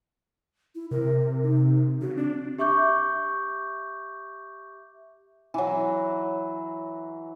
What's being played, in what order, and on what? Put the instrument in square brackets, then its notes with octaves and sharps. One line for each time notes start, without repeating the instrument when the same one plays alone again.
[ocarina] E4
[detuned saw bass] C3 [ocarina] A#4
[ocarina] D#4
[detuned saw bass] C#3 [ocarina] F#4
[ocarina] C4 [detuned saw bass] D4
[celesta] G4 E5 C#6 D6 G6
[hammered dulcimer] E3 F#3